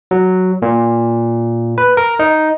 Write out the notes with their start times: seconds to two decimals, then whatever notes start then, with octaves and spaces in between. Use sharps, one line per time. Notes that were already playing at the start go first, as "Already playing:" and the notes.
0.11 F#3
0.62 A#2
1.78 B4
1.97 A#4
2.19 D#4